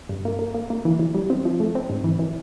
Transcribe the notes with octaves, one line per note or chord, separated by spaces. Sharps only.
G2
A#3
A#3
A#3
A#3
E3
E3
G3
C4
F3
A3
C4
G#2
E3
E3